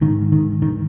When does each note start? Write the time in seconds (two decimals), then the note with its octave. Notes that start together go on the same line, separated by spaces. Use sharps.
0.01 G#2 D#3
0.32 D#3
0.62 D#3